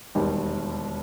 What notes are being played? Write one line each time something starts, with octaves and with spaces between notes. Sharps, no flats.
E1 D#2 D#3 G3